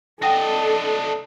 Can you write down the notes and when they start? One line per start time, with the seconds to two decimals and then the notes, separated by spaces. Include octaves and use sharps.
0.22 D4 A4 D#5 F#5 G5 A#6